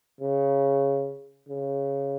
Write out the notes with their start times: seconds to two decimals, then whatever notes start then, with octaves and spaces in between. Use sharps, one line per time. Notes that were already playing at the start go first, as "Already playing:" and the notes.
0.21 C#3
1.49 C#3